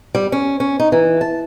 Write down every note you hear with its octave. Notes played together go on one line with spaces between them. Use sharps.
G3
C#4
C#4
D#4
E3
A5